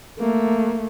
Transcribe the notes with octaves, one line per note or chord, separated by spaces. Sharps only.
A3 A#3